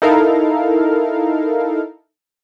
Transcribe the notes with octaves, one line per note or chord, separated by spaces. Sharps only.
D#4 E4 A4 A#4 F5